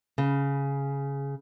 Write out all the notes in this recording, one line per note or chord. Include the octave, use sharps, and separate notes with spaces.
C#3